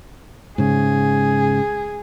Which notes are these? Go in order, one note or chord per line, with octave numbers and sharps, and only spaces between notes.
G#2 C#3 G#4